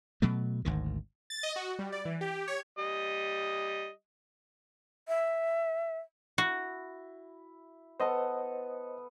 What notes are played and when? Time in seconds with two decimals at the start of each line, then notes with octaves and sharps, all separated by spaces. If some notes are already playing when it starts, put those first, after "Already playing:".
0.22 B2 F#3 A3
0.65 G#1 D2 D#3
1.30 A6
1.43 D#5
1.56 F#4
1.79 G3
1.92 D5
2.05 E3
2.21 G4
2.48 C#5
2.79 G3 D#5
5.08 E5
6.38 E4 F#4
8.00 B3 A4 C5 D#5